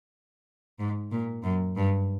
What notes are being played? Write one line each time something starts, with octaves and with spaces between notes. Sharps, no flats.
G#2
A#2
F#2
G2